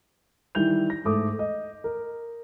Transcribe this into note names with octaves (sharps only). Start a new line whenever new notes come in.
D#3 E3 G3 E4 G6 F7
A#6
G#2 A3 D6 D#6
D#5
A#4